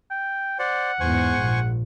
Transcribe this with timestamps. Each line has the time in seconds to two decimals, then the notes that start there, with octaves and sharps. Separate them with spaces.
0.11 G5
0.59 C5 D5 F#5
1.00 E2 G#2 C5 G#5 C#6
1.40 A#1